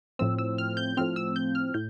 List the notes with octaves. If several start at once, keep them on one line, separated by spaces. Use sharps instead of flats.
A2 F3 C4 E6
E6
F6
G6
A2 F3 C4 F6
E6
G6
F6
A2 G6